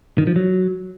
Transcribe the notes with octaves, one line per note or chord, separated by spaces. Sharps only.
D#3
F3
F#3